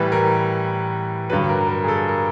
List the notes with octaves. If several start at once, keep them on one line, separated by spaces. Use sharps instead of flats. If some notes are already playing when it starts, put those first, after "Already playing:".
Already playing: A2 E3 G3 B4
A#4
G2 D3 F#3 B4
A#4
A#4
G#4
A4
A#4